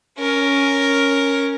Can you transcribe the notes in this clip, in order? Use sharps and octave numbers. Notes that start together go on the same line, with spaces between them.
C#4 A#4